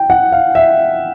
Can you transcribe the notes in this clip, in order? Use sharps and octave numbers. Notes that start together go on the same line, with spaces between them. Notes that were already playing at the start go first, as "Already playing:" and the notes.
Already playing: G5
F#5
F5
E5